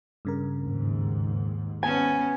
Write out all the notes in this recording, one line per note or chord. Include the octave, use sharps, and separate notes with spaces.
G2 C#3 A#4
D#2 G#2
B3 C#4 G#5 A5